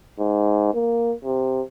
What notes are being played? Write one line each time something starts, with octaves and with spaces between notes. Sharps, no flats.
G#2
A#3
C3